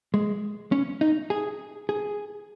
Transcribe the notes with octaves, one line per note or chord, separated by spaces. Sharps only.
G#3
C#4
D#4
G#4
G#4